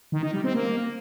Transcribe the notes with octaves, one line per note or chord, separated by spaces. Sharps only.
D#3
D#4
G3
C4
A#3